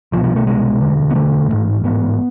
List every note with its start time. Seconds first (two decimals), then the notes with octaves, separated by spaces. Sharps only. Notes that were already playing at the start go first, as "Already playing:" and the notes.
0.12 C2 F3
0.17 B2
0.24 F3
0.36 A3
0.46 C2 B2 G#3
0.81 E1 D2 D3
1.10 B3
1.15 E1 D2 D3 A3
1.49 A1 G#2
1.84 A1 G#2 B3